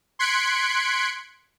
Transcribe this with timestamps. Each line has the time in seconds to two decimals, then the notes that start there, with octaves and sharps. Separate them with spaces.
0.19 C6 F#6 G#6 B6 C#7 D7